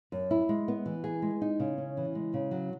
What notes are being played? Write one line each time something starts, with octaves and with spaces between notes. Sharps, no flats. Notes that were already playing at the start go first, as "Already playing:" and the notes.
F#2
E4
G#3
B3
E3
G#4
G#3
D#4
C#3
C#4
E3
G#3
C#3
F#3